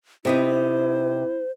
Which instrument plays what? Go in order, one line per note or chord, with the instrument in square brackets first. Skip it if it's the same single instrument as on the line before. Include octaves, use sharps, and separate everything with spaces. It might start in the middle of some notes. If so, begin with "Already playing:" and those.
[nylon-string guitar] C3 B3 D#4 [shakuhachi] E4 [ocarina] C5